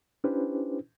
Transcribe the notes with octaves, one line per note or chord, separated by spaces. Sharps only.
C#4 D4 E4 G4 B4 C5